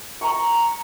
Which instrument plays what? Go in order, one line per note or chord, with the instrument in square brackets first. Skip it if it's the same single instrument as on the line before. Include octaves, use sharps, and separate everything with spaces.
[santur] A#5 C#6